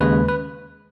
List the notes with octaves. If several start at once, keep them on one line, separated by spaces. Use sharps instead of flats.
D#2 C#3 G#3 B4
B4